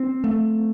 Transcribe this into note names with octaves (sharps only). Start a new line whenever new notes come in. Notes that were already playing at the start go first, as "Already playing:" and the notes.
Already playing: C4
A3